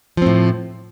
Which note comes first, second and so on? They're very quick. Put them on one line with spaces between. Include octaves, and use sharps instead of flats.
F3 C4 A2